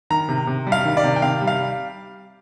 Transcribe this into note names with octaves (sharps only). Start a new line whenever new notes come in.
D#3 A#5
C3
C3
G3
F5
D#3
D5
C3
G5
C3 F5
G3
F5